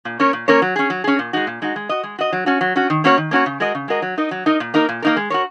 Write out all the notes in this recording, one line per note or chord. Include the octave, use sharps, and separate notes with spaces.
A#2
A#3 C#4 A#4 C#5
A#2
A#3 C#4 A#4 C#5
F#3
C#4 G#4
F#3
C#4 G#4
A#2
G#3 D#4 F#4
A#2
G#3 D#4 F#4
G#3
F#4 D#5
G#3
F#4 D#5
F#3
C#4 F#4
F#3
C#4 F#4
D#3
A#3 C#4 F#4 C#5
D#3
A#3 C#4 F#4 C#5
C#3
G#3 F#4 A#4 D#5
C#3
G#3 F#4 A#4 D#5
F#3
D#4 A#4 D#5
F#3
D#4 A#4 D#5
A#2
A#3 D#4 A#4
A#2
A#3 D#4 A#4
G#3
F#4 A#4 C#5